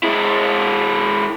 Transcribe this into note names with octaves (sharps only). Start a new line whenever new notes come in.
G#3 E4